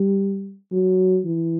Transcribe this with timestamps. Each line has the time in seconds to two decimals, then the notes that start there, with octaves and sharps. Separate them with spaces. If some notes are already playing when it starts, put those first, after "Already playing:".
Already playing: G3
0.72 F#3
1.25 E3